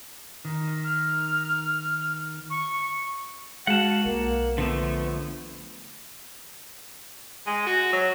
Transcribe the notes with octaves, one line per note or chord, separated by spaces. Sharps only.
D#3
F6
C#6
G#3 F#4 F5 F#5 A5
B1 A#3
D3 F3 A3 B3
G#3
F#4
F#3